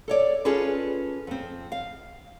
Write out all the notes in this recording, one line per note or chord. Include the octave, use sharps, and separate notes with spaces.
A4 C#5 D5
C#4 F4 G#4 A4 B4
F2 C4
F5